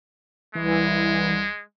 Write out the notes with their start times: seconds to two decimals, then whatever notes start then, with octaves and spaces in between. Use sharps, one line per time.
0.55 C2 E3 G#3